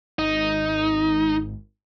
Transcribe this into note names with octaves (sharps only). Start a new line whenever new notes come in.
G#1 D#4